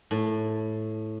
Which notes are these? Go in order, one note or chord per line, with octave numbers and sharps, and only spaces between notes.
A2